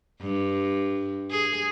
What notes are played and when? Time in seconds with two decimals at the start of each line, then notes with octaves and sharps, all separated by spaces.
0.21 G2
1.31 G#4